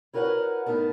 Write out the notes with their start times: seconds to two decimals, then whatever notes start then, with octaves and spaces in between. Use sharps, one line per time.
0.13 E4 F#4 A#4 B4 C#5 F#5
0.66 A2 B3 D#4 A#4 A5